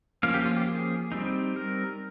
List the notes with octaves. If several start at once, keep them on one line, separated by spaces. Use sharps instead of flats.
F3 A#3 C#4 F5
G4
F4
G4
G#4
G3 C4 D#4
A#4